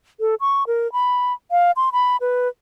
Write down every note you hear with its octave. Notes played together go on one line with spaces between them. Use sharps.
A4
C#6
A#4
B5
F5
C6
B5
B4